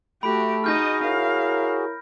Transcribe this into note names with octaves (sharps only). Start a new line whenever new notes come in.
A3 F#4 G4 B5 D7
D#4 F#4 G#4 D#5 F6 G6 A#6
E4 A#4 C#5 F5